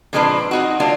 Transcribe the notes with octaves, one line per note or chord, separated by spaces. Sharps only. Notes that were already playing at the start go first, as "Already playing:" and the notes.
A#2 F3 G#3 C4 D4 B4
C4 D#4 F#4
F#3 A#3 D4 F4